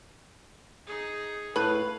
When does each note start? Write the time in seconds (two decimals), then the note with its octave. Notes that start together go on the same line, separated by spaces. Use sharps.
0.87 D#4 G#4
1.56 A2 B4 F5